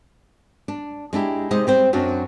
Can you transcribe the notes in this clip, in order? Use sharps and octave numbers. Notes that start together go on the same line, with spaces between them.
D4
G#3 D4 E4 G4
C3 G#3 D#4 D#5
G3 C4 C5
F#2 F#3 C4 D4